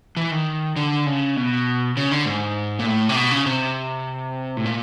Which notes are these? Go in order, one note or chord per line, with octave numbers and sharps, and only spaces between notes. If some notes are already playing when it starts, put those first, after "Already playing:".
E3
D#3
D3
C#3
B2
C#3
D3
G#2
A#2
A2
C3
B2
C#3
C3
A2
A#2